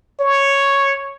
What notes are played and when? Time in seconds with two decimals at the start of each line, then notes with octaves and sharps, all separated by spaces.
0.20 C#5